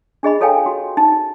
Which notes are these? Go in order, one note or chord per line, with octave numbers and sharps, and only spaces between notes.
D4 G#4 D#5 B5
F4 A4 C#5 F5 G5 G#5
F#4
D#4